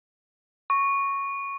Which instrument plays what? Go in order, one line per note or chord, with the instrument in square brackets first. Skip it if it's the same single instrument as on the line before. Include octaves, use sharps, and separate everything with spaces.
[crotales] C#6